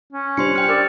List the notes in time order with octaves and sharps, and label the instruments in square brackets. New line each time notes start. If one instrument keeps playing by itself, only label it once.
[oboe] C#4
[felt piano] G3 D4 [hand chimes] C5 C6 C#7
[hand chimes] G5 F6
[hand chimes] A#4 [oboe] D5